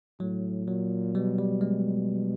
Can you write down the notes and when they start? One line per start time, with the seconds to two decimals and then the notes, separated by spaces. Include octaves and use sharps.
0.20 A2 F#3
0.67 A#2 F#3
1.15 B2 G3
1.39 G3
1.61 G#3